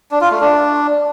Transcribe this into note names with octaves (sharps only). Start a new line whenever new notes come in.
D4
F4
A3
D4